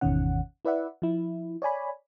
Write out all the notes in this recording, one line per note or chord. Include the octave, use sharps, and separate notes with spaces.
G#1 E2 B2 D#3 C#4 F#5
E4 B4 D5 E5 F#5
F3 E4
C#5 D5 G#5 B5